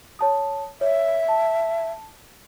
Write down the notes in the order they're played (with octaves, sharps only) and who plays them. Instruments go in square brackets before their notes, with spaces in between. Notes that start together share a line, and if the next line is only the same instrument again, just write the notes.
[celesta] C#5 A5 D#6
[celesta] C#5 [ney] E5
[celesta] A5